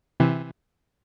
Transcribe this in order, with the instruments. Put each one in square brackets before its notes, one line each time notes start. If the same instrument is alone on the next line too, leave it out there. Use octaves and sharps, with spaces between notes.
[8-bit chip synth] C3 E3